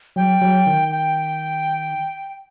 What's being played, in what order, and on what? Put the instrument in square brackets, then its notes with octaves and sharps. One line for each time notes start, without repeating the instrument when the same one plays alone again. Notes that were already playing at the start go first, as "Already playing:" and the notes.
[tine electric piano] F#3 [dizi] G5
[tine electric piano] F#3
D#3
[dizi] G5